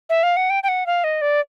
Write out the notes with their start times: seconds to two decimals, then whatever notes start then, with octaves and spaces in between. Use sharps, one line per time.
0.10 E5
0.23 F5
0.37 F#5
0.50 G5
0.63 G5
0.68 F#5
0.86 F5
1.04 D#5
1.22 D5